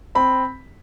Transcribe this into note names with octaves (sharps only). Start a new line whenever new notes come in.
C4 B5